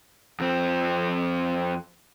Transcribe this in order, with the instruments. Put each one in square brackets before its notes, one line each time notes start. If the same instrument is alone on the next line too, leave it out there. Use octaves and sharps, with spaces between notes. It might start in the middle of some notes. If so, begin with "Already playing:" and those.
[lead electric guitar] F2 C4